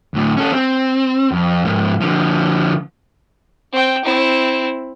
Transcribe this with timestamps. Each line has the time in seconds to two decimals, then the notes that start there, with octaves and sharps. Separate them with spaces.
0.14 D2 A2
0.37 C#4 A4
0.53 C4
1.32 F2
1.65 G#2 F3
2.01 D3 F3
3.72 C4 G5
4.04 C4 E4